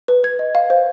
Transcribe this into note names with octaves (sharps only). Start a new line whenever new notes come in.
B4
B4 G#6
D#5
F5
C5